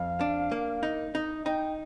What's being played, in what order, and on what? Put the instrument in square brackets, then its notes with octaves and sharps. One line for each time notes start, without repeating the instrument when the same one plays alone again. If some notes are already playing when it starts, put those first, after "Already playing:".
Already playing: [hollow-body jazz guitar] F2 [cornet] F5
[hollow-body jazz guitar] D4
A#3
D#4
[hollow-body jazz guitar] D#4 [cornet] D#5
[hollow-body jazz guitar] D#4 [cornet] G5